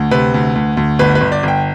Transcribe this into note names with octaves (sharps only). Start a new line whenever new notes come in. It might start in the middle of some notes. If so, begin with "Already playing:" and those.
Already playing: D2
C3 B4
D2
D2
D2
G1 B4
B4
G1
D5
G1 G5